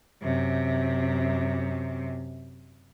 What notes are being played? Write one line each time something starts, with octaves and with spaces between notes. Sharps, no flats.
F#2 C3